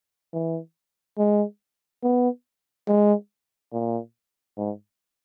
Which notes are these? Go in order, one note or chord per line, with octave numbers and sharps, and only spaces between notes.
E3
G#3
B3
G#3
A#2
G#2